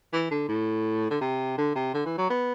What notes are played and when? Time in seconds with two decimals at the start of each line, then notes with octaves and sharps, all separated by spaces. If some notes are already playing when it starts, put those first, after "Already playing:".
0.13 E3
0.31 D3
0.49 A2
1.11 D3
1.21 C3
1.58 D3
1.76 C3
1.94 D3
2.05 E3
2.18 F#3
2.30 B3